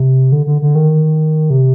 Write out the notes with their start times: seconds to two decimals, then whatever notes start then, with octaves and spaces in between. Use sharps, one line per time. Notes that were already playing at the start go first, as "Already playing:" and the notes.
Already playing: C3
0.32 D3
0.46 D3
0.62 D3
0.75 D#3
1.50 C3